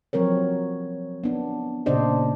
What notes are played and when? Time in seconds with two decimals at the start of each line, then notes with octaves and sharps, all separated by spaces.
0.13 F3 F#3 C4 A#4 C#5
1.24 B3 D4
1.86 A#2 C#3 D4 C5 D5 D#5